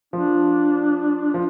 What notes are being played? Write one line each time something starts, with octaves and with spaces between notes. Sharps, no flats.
F3 D4
F3